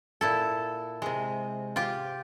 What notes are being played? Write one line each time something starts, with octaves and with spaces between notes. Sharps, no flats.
A#2 E4 A4
C3 G#3
F4 G4